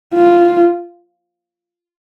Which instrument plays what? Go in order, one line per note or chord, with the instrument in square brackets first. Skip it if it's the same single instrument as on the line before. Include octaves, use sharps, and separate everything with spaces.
[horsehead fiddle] F4